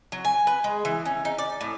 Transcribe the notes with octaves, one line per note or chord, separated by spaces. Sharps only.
F#3
G#5
B4
G#3
E3
C#4
D#4
D5
A2